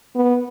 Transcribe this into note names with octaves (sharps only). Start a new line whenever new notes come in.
B3